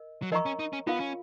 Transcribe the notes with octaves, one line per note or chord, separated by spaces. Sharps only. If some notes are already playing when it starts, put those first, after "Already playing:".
Already playing: A#4 D#5
F#3
F3 A#4 D#5 A#5 C#6
C#4
D#4
C#4
B3 F4 A#4 F5 B5
C#4